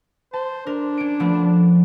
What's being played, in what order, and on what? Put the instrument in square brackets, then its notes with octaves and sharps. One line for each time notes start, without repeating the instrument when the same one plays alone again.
[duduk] C5 [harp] A5
[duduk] D4 [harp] A#4
[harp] C#4 D7
F3 A3 B3